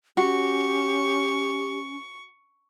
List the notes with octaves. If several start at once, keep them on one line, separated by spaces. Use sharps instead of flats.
C#4 F#4 G4 C#6